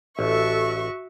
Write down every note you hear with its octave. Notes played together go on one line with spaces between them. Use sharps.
A1 F#4 A4 E5 C#6